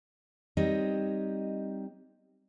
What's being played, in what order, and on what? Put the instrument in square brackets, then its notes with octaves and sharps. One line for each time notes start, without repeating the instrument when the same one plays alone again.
[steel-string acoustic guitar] G3 C4 D#4 C#5 D#5